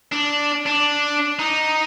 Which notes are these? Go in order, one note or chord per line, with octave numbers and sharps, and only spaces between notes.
D4
D4
D#4